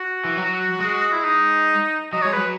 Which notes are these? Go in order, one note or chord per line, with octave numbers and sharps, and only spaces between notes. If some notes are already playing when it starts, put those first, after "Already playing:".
Already playing: F#4
E3
F#3
G#3
E4
D#4
F#3 D#5
G#3 C#5
F#3 B4